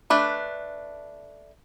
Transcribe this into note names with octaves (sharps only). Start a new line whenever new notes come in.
A3 D4 B4